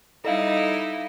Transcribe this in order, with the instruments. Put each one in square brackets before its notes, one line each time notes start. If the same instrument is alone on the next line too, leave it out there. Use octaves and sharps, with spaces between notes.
[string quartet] G3 D#4 E4 [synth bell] A4 D#5 F5